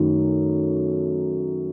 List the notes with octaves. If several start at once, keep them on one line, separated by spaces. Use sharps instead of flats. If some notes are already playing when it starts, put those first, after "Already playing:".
Already playing: F#2 D#3 A3